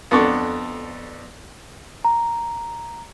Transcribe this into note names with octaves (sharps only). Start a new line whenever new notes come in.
F2 B3 D4 A4 D5 C#6
A#5